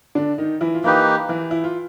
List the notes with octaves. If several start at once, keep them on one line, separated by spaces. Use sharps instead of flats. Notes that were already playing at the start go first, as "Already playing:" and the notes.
D3 D4
D#3 D#4
E3 E4
F4
E3 A#3 D#4 E4 G4 B4
E3 E4
E4
F4